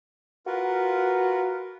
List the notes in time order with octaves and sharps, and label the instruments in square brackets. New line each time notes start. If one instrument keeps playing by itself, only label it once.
[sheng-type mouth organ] F4 A#4 B4 [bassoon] F#4